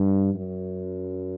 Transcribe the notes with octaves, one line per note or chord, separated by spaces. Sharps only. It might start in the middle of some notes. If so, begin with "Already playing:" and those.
Already playing: G2
F#2